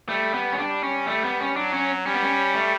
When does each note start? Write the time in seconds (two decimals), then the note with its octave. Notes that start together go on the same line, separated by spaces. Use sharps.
0.09 G3 A3
0.34 B3
0.53 C#4
0.58 G3 D4
0.83 C#4
1.07 G3 A3
1.24 B3
1.40 C#4
1.56 F#3 D4
1.73 C#4
2.06 G3 C#4
2.14 B3
2.22 C#4
2.54 A3